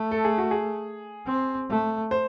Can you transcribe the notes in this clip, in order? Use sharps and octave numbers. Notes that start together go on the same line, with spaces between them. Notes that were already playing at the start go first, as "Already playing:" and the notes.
Already playing: A3
A4
G#4
F#4
G#4
C4
A3
C5